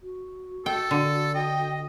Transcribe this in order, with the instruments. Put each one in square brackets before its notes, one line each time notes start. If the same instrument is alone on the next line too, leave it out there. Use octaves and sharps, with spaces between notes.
[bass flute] F#4
[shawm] A4 [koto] G5
[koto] D3
[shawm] D#5 [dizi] G5